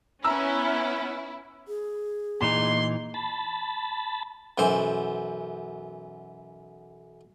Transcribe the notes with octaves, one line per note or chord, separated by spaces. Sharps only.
B3 C#4 E4 A#5 E6
G#4
A#2 E3 D#4 C6
A5 B5
B1 F#2 E3 C5 C6